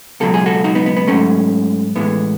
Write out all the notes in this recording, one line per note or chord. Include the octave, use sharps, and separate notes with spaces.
C#2 B2 F#3 A4
G#4
F#4 A4
D#4 F#4
B3 D#4
B3
B3
G#2 F#3 A3 C#4
A2 E3 G#3 B3